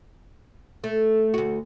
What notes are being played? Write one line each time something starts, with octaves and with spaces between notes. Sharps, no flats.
A3
D2 F#4